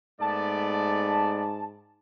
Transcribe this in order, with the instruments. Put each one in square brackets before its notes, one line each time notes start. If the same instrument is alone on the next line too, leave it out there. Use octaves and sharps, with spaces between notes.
[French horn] G#2 [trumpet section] A3 B3 D5 [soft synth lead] A5